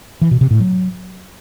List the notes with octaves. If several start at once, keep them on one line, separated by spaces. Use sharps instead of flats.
E3
B2
C3
A2
F#3